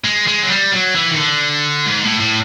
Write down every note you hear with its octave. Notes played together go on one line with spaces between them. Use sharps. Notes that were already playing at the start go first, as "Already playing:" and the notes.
G#3
G#3
F#3
G3
F#3
E3
D#3
D3
G#2
A2
A2